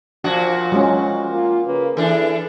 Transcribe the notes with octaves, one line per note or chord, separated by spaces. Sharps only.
A#2 F3 D4 F#4
F#3 G#3 C#4
A#3 F4
C#3 A#3 B4
E3 D4 E4 G#4 A4